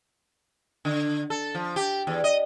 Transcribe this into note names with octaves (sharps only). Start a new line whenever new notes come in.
D3
A4
F3
G4
E2
D#5